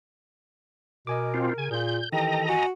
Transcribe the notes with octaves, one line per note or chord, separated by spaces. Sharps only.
B2 A#4 D#5 G#5 D6
C4 F4
C#3 G#5
A#2 F4 G#4 G6
D#3 E3 G4 A4 D#5 G5 A#5
F#4 G#5